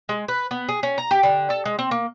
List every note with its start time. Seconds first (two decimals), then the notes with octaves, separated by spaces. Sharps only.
0.09 G#3
0.28 B4
0.51 B3
0.68 G#4
0.83 C#4
0.98 A#5
1.11 G4
1.23 D3
1.50 A4
1.65 G#3
1.79 C4
1.91 A#3